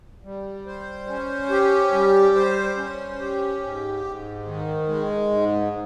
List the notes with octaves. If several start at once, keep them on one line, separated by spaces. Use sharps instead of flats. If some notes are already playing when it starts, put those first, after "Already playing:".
G3
C5
C#4
G4
G3
C5
C#4
G4
G#2
G#2
D#3
G#3
G#2